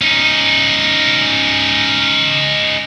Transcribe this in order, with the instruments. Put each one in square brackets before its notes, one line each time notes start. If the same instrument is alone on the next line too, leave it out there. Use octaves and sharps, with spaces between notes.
[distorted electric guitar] C#4 D#4